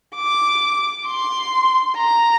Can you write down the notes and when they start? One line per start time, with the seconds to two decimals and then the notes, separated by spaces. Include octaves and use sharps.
0.16 D6
1.07 C6
1.97 A#5